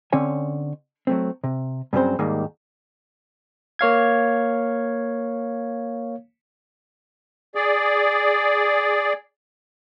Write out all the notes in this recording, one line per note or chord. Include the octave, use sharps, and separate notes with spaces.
D3 C4 C#4 C#5 G#5
F#3 A3 C4
C3
G2 C#3 F#3 C4 C5
D#2 G#2 D#3 G3 A#3
A#3 C#5 F5 G#6
G#4 D5